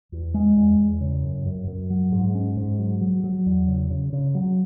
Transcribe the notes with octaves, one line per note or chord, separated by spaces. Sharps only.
E2
G#3
E2
E2
C#3
F#2
F#2
F#2
F#3
G#2
C#4
G#2
F#3
F#3
F#3
E2
C#3
C#3
C#3
F#3